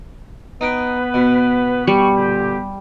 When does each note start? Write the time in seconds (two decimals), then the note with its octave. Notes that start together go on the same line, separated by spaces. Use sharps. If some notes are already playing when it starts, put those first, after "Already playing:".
0.61 B3 D#4 B4 G5
1.14 B2
1.87 G3 C#6
2.16 A#2 D3 G4